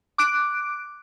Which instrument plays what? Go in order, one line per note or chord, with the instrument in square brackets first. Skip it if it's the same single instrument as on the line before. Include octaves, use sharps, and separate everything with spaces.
[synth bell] D6 F#6 D7